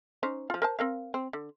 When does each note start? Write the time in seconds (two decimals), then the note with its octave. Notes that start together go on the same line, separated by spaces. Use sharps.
0.23 C#4 D#4 C5
0.50 F3 F4
0.62 A#4 C5 A5
0.79 C4 A#4 F5
1.14 C4
1.33 D3